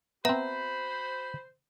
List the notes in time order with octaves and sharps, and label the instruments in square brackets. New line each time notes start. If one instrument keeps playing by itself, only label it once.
[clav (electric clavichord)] B3 C4 [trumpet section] F#4 B5 [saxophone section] C5 [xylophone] E5 A#5